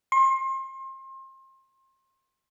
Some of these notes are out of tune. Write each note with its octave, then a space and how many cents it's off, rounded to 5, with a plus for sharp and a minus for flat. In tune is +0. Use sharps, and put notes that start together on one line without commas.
C6 +30